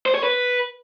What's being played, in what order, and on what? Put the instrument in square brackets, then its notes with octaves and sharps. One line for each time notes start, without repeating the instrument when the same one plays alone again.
[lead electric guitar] C5
C#5
B4